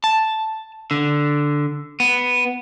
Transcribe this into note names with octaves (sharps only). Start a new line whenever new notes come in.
A5
D3
B3